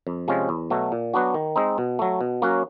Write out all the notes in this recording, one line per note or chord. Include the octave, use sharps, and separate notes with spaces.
F2
C3 F3 G#3 C#4
E2
B2 F#3 A3
A#2
F#3 B3 D4 F#4
D#3
G#3 C4 D#4
B2
F#3 A3
B2
F#3 A#3 C#4 F#4